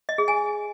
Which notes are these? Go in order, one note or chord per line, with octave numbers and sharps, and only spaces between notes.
D#5
G#4
G#5